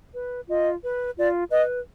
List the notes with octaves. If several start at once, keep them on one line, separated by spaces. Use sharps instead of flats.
B4
F4 D#5
B4
F4 D5
B4 D#5